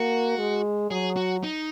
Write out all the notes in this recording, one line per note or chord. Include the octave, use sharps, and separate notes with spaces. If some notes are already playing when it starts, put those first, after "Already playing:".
Already playing: A#3 F#4
G#3
F#3 G#4
F#4
D#4